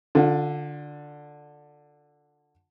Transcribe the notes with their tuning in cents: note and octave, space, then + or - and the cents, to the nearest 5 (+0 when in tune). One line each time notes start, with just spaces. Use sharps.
D3 +5 F4 +30